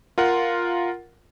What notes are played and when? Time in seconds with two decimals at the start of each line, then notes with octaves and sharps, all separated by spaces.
0.18 F4 A#4 F#5